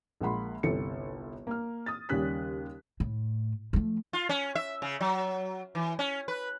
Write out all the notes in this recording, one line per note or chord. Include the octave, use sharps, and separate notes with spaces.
A#1 G#3 A#3 F#5 B5 C6
G1 C2 A4 C#7
A#3 F6
D#6 A6
D#2 C#3 G3 C#4 F#6 B6
A2
F3 A3
F4
C#4
E5
C#3
F#3
E3
C#4
B4